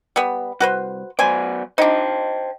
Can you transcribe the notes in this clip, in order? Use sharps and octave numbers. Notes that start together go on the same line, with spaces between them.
G3 B3
C2 F#4 B4 C5
F#3 B3 C5 D5 G#5
D4 D#4 C5 D#5 G5